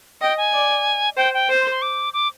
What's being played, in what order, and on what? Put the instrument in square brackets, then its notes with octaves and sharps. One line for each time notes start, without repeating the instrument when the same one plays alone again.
[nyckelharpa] D#5 [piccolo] G5
[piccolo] G#5
[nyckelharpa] D5
[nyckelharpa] C5 [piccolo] G5
[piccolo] G5
[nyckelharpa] C5
[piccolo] C6
C6
D6
D6